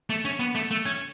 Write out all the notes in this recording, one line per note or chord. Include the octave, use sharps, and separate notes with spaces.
A3
C#4
B3
A3
A3
C#4